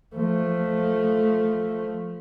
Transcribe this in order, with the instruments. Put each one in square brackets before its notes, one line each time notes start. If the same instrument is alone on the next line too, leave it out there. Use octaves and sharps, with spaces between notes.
[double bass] F3 A3